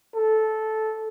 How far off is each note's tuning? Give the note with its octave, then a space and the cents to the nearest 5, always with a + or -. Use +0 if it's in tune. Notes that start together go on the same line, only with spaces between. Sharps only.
A4 -10